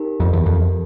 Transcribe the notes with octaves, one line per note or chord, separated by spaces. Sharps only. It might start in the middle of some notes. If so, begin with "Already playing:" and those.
Already playing: D#4 G4 A#4
F2
E2
F2